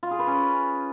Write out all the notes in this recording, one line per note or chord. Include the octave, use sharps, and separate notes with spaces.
F4
G#4
B4
C#4